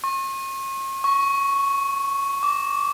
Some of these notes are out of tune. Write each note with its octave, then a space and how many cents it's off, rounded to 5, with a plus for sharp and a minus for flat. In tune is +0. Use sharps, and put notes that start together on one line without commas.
C#6 -45
C#6 +0
D6 -25